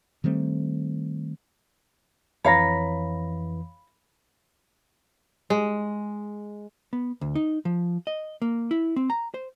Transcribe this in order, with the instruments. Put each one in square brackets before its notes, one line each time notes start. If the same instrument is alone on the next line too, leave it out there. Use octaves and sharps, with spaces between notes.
[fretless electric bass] D#3 G3 A3 C4
[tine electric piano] F2 E3 [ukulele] C#5 F5 A#5 [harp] B5 A#6
[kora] G#3
[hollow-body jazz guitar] B3
D2
D#4
F3
D#5
A#3
E4
C4
A#5
C5